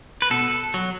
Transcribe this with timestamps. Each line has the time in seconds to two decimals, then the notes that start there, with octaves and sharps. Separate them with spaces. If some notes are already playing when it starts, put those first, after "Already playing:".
0.22 B4
0.31 B2 A4
0.74 F#3